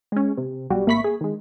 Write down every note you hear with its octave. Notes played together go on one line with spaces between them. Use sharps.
G#3 C#4
C3
B1 G3 F#4 G4
G#1 A#3 E5 B5 C#6 B6
G#4
D#3 G#3